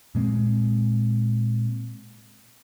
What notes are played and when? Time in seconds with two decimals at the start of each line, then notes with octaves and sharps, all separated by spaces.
0.15 A#2 G#3 B3 C4